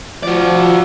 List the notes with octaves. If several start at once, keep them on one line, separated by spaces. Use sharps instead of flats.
F3 F#4 D5